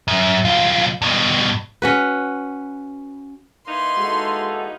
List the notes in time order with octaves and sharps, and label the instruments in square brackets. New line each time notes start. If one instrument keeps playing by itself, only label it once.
[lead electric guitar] F#2
B1 F4
G2 B2
[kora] C#4 F#4 B4
[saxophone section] E3 A#3 D#4 [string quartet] C6
[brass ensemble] G#3 F#4 A4